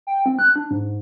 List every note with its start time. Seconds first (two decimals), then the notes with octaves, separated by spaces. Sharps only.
0.07 G5
0.26 C4
0.39 F#6
0.56 D4
0.71 G#2